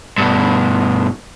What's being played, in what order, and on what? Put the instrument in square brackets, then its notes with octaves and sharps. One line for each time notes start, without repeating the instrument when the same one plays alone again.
[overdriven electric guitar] G2 B2